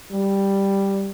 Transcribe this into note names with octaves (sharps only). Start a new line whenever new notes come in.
G3